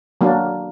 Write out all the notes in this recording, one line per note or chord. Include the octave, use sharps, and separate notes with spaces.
F#3 A#3 D4